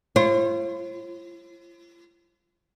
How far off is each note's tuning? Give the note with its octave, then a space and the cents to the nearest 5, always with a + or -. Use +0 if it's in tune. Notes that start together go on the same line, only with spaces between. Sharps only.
F4 -40 C5 +45